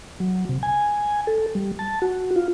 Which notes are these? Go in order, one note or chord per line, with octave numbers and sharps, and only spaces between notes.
F#3
C3
G#5
A4
G3
A5
F#4
F4